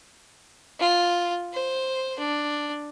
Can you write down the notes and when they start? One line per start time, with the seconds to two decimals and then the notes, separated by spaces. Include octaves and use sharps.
0.80 F4
1.54 C5
2.19 D4